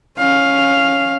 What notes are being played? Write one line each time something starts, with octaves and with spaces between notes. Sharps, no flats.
C#4 F5